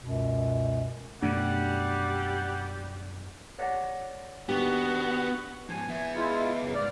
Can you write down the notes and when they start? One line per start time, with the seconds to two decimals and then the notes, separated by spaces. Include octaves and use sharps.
0.01 C#2 F#2 B2
1.22 F#2 B2 G3 A3 D4 F#5
3.59 C#5 D5 F#5
4.49 D#2 B3 D4 F#4 G4
5.69 G#2 F3 G#5
5.88 B3 E5
6.15 G#3 E4 F4
6.62 F#2 C#3
6.75 C#2 G#2 D5 F6